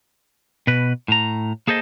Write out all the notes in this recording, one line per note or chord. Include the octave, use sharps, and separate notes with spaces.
B2 B4
A2 A#5
A#3 G#4 A4 C5 D#5